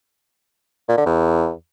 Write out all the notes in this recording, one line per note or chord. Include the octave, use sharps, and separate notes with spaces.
A#2
D3
E2